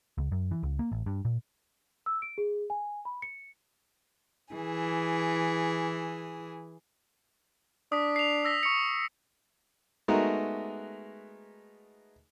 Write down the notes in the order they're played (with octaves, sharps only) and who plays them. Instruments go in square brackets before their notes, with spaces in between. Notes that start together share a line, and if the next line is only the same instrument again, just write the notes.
[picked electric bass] C#2
F#2
E3
C#2
A#3
A1
G2
A#2
[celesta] E6
D7
G#4
G#5
B5
C#7
[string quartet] E3 G#4
[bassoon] D4 [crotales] D#6 B6
[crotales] C7 F7
E6 A#6 B6
C#6 C#7
[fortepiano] G#3 A3 B3 D#4 F#4 A#4